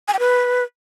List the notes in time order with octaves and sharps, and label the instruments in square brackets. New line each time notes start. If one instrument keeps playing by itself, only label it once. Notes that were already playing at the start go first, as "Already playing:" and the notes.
[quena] G#5
G5
B4